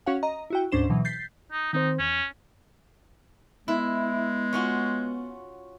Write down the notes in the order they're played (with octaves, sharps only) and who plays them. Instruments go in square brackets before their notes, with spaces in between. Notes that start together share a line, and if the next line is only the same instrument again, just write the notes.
[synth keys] C#4 F#4 C#5 F5 F#5
D#5 A#5
E4 F#4 G5
D2 G#2 C#4 D4 C5 E7
B2 E3 F#3
G6 A6 B6 C7
[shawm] D#4
[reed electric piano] D#3 C4 C5 [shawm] D#4
[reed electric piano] E2 [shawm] C#4
[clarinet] G#3 [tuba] B3 [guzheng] E4
[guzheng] C#4 F4 F#4